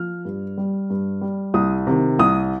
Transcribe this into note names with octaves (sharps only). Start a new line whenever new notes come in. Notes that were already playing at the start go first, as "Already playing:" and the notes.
Already playing: F3 F6
G2
G3
G2
G3
C2 D#6
C3 D#3
C2 D#6